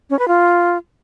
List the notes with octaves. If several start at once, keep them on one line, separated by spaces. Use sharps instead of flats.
C#4
B4
F4